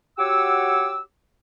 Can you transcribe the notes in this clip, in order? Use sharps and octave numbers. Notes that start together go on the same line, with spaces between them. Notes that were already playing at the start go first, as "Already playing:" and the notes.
F#4 G4 C#5 F#5 D6 E6